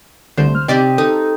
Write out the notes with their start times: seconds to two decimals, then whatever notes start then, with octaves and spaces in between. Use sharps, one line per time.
0.38 C2 D3 A3 C5
0.55 F6
0.68 C3 C4 D#4 G4 D5 D#5
0.98 D#4 A4 D#6